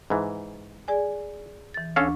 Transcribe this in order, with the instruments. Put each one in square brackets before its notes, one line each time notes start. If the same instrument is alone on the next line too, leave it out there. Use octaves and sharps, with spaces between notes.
[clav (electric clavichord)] G#2 E3
[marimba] G#4 D5 G#5
E3 A6
[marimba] D2 D4 C#6 [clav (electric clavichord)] C#4 A4 F5